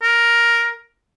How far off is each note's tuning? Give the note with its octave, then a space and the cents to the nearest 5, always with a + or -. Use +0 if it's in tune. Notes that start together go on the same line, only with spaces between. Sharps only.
A#4 +5